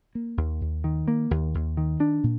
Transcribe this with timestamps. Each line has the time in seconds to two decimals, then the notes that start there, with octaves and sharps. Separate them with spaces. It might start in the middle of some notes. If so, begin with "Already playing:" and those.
0.15 A#3
0.37 D#2
0.61 D#2
0.84 D#3
1.08 A#3
1.31 D#2
1.54 D#2
1.77 D#3
2.00 D4
2.24 A#2